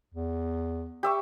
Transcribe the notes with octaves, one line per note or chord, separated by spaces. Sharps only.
E2
G4 E5 C#6